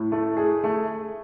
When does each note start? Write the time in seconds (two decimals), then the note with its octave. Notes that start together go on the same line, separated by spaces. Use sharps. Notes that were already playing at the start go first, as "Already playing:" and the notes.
Already playing: A2
0.12 A3
0.37 G#4
0.64 A3